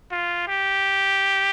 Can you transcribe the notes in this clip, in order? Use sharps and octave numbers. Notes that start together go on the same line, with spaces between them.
F4
G4